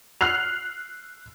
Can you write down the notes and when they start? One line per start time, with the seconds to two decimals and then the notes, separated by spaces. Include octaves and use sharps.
0.21 F6 F#6 C7 F7